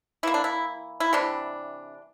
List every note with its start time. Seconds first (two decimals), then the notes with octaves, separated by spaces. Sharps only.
0.23 E3 A#3 E4
0.34 D4
0.44 E4
1.00 E4
1.13 C3 E3 G3 D4